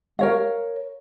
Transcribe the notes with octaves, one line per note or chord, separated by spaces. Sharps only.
A#4 C#5 F5